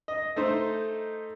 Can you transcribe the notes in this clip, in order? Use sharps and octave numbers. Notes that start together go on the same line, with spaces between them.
D#5
A3 D#4 C5